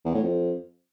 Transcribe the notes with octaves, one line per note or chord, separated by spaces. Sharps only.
E2
A2
F2